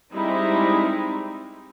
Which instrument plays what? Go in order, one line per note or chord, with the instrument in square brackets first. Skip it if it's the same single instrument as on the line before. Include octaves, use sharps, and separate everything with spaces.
[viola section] G3 G#3 C4 D#4 E4